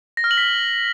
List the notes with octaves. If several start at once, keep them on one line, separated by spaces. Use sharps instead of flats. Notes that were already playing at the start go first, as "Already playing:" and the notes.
A#6
F6
F#7
B6